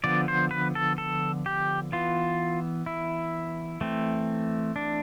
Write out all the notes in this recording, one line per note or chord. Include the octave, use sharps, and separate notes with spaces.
D3 F3 B3 D5
C5
B4
A4
A4
G4
E3 B3 F4
E4
E3 A3 C4
D4